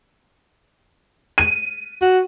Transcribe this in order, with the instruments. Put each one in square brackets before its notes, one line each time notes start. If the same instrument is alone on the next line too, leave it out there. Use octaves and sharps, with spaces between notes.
[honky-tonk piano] D#7
[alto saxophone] F#4